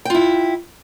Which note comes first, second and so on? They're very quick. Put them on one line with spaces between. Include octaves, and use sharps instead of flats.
G5 F4 E4